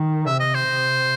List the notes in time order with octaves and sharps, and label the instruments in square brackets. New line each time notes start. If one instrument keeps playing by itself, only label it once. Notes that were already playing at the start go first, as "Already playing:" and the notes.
Already playing: [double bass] D#3
[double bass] C3 [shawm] E5
[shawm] D#5
C5
[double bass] C3